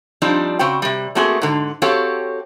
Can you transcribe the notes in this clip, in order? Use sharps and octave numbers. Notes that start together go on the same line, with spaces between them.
F3 G3 C4 D4 D#4
C#3 C4 F#4 G5
C3 G3
A3 A#3 C4 F#4 G#4
G#2 D3
C4 F#4 G4 A4 C#5 F5